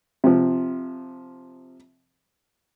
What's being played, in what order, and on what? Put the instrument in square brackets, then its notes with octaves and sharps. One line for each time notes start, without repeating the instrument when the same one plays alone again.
[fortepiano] C3 F3